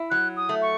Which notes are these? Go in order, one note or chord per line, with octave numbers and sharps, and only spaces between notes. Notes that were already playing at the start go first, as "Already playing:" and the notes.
Already playing: E4
F#3 F#6
D#6
A3
C#6